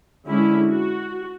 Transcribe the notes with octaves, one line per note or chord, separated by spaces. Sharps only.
D3 G#3 C#4 E4
F#4